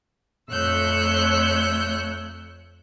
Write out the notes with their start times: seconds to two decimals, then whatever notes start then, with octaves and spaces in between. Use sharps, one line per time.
0.50 F2 A3 C#5 E6 F#6 G6